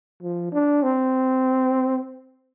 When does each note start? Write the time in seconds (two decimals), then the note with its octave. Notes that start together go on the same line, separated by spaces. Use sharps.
0.22 F3
0.52 D4
0.83 C4